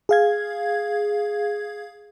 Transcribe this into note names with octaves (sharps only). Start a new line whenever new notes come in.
G#4 F5 G#6